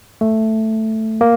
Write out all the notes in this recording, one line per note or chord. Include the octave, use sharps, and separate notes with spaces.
A3
A#3